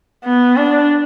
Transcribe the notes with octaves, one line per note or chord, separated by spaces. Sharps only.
B3
D4